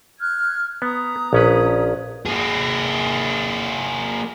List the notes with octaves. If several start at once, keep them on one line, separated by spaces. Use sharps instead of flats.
F6 F#6 G#6
B3 A#5 D#6
A#1 C#4 B4
A#3 G#4